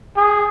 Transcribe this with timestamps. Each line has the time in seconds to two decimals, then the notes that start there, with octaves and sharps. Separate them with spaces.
0.17 G#4